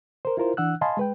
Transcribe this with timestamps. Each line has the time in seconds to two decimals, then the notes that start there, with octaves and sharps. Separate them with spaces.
0.25 A#4 C5
0.37 E4 F4 A#4 C5
0.57 E3 D4 F#5 E6 F#6
0.81 D#5 F5 G#5 A5 B5 C6
0.97 G#3 B4 G5